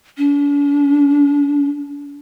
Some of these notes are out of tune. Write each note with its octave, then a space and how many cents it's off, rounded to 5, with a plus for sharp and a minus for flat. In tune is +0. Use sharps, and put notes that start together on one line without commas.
D4 -45